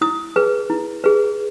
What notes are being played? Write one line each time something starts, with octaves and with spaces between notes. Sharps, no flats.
E4 D#6
G#4 B4
E4
G#4 B4